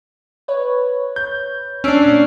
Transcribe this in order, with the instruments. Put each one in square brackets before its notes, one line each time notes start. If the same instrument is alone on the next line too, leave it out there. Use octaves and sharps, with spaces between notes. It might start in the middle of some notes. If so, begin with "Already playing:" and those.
[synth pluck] B4 C#5
[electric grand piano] G6
[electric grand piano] C#4 D4 [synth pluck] E6 C7 D7
[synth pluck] A#2